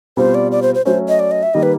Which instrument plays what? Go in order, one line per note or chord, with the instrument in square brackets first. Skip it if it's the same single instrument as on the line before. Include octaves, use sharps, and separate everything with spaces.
[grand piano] B2 G3 C4 F4 [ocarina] C5
[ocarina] D5
D5
C5
C5
[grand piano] F#3 A3 C#4 [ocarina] C5
[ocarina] D#5
D5
D#5
E5
[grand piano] D#3 G3 A#3 D#4 [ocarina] D#5
[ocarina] B4